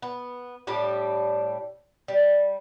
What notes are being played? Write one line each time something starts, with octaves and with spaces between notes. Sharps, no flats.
B3
A2 G3 D4 G4
G3